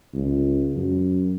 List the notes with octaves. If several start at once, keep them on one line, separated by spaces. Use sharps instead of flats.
C#2
F#2